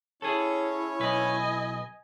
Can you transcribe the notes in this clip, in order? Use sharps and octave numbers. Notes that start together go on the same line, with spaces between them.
C#4 E4 G#4 A4 C#5
B1 B4 D#5 G#5